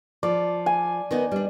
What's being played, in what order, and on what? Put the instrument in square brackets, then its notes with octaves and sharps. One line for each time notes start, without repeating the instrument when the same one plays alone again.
[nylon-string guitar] F3 [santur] D5
[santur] G#5
[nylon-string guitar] D#3 B3 D#4
G3 D4